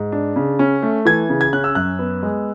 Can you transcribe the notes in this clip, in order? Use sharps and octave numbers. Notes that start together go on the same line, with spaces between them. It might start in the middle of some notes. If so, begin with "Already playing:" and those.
Already playing: G#2
D4
C#3
C#4
A3
E3 G#6
C#3
G#6
C#4 F#6
E6
F#2 F#6
B3
G#3